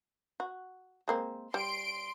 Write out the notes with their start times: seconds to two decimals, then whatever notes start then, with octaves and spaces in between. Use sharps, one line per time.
0.40 F#4
1.08 G#3 A#3 C4
1.54 G3 C6 D7